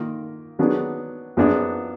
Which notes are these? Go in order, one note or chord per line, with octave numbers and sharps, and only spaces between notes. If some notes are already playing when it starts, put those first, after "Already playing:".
Already playing: D#3 A#3 F4 A#4
D#3 F#3 B3 D4 G#4
F#2 F3 B3 D4 G#4